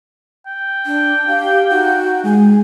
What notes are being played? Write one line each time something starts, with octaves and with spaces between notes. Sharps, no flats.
G5
D4
G4 F5
D#4 F#4
G#3 G#5